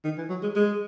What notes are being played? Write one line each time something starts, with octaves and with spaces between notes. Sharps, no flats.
D#3
E3
F#3
G#3
G#3